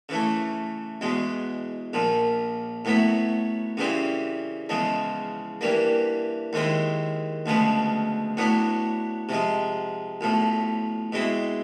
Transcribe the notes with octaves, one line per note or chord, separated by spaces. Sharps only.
C#3 E3 A3
E2 B2 G#3
A#1 A#2 F3
A2 F#3 B3 E4
F#2 C#3 E3 G3 C4
E2 C#3 F3 G#3
G2 E3 G3 A#3
D#2 D#3 G#3 C4 E4
D2 C#3 F3 G#3 B3
A2 F#3 B3 D4
C3 F3 G#3
B1 A2 F3
B2 G#3 C4 E4